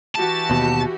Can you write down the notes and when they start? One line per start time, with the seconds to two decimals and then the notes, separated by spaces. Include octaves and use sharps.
0.16 E3 F#4 G4 A5
0.50 D#2 B2